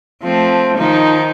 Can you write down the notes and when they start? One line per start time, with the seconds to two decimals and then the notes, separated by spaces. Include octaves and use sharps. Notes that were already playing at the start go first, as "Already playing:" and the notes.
0.23 F3 A3 C4
0.77 D#3 F3 D#4